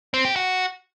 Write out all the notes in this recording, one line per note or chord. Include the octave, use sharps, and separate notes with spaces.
C4
G4
F#4